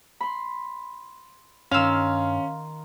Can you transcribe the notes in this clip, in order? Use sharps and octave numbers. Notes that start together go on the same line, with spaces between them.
B5 C6
G2 D#3 C#4 F5 C6 E6